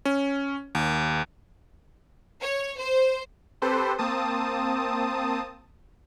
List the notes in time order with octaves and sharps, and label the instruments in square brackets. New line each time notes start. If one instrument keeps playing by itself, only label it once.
[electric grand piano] C#4
D#2
[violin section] C#5
C5
[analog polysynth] C4 G4 A4 B4 C5
A#3 C4 A5 D#6